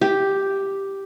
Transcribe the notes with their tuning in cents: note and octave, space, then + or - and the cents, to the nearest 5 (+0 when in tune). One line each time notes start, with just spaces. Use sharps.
G4 +0